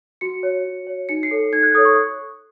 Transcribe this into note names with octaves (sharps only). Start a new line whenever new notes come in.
F#4 C#7
C#5
F#4
C#5
D#4 C#7
C7
A4 C#5
D#4 G#6
F#6
A4 C#5 D#6
C#6